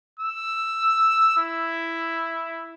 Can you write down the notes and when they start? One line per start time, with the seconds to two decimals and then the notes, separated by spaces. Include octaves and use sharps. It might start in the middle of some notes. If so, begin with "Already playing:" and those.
0.19 E6
1.38 E4